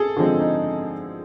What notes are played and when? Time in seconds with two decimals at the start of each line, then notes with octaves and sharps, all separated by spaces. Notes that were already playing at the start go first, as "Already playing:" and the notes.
Already playing: G#4 A4
0.17 D3 F3 G#3 C4
0.40 D#4